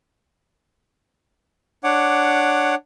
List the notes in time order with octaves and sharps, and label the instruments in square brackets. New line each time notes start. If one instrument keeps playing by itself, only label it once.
[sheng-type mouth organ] D4 C#5 F#5 D6